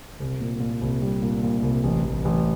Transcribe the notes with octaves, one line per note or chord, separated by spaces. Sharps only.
C2
A#2
A#2
C2
G3
A#2
A#2
C2
A1
A1
A1